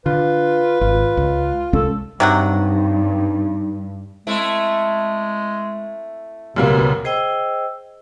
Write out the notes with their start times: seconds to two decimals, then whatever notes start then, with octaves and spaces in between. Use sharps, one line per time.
0.06 D3 F4 B4
0.81 G#1 F4
1.17 C#2
1.73 C2 G#3 C#4 A4
2.20 G2 C3 F#3 D#4 F#5
4.27 G#3 A3 C4 E4
6.56 C#2 F#2 B2 G3 A#3 B3
7.05 G#4 C5 D#5 G5 E6